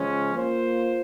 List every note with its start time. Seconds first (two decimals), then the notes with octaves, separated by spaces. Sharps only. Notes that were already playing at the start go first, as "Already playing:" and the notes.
Already playing: C#3 F3 G#3 C#4
0.33 A#3 F4 C5